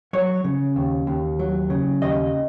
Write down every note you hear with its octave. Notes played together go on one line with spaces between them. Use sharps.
F#3 C#5
C#3
D#2
D#2
F#3
C#3
D#2 D#5